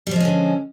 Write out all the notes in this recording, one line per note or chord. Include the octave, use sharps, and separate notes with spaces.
D3 F3 G3 G#3 C#4